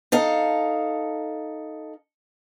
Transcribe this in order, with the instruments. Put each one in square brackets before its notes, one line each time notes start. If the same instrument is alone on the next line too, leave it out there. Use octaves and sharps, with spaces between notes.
[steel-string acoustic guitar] D#4 A4 F5